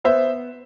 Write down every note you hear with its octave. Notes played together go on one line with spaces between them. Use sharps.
B3 C5 E5